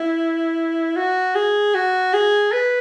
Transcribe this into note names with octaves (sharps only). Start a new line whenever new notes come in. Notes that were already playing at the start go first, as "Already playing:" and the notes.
Already playing: E4
F#4
G#4
F#4
G#4
B4